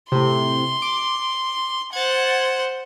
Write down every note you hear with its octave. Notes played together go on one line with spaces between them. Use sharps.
A2 C3 C6
D6
C5 F#5 G#6 A6